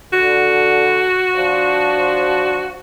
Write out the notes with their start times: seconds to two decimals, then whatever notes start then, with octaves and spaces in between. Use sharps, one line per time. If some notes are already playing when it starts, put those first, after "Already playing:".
0.13 D3 F#4
1.36 F3 D4 C5